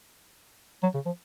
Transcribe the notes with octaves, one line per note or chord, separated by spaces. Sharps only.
F#3
C#3
F3